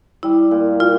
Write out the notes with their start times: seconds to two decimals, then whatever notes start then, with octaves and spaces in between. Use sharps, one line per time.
0.23 G3 E4
0.51 A#2
0.80 A#2 F4